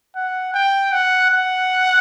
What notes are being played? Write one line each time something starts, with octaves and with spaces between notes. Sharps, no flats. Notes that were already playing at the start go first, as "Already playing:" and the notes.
F#5
G5
F#5
F#5